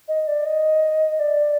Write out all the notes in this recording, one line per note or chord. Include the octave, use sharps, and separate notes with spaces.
D#5
D5
D#5
D5